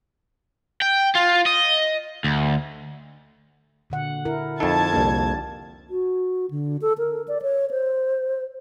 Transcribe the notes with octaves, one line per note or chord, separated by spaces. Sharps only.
G5
F4
D#5
D2
A#2 D3 F#5
E4 A#4
F2 D#4 A4 A5 G#6
C2 A#3 D4 G4
F#4
D3
A4
A#4
D5
C#5
C5